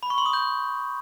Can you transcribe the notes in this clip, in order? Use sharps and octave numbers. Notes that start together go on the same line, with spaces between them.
B5
C#6
C6
D#6
G6